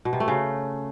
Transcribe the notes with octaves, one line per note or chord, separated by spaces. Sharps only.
B2
C3
A3
C#3